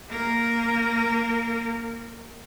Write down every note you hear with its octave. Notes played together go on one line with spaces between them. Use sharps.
A#3 A#4